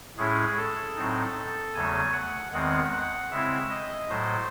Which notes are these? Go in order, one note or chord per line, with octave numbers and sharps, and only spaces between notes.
A2 G#3 C#4 E4 G#4
A4
A2 F#3 C4 D#4
E2 C#3 F#3 A3 G#5
F#5
E2 D#3 G#3 C4 F#5
F#5
C#3 G#3 C4 E4 E5
D#5
A2 F#3 A3 C5